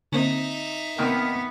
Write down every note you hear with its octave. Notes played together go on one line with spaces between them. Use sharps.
D3 A#3 C4 D#4 E5
C3 D#3 A#3 B3 F#5 G5 D#6